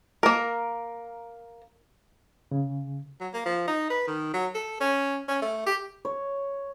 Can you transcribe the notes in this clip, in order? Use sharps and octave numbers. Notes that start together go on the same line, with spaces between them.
A#3 A#4
C#3
F#3
A#3
F3
D#4
B4
D#3
F#3
A4
C#4
C#4
A3
G4
C#5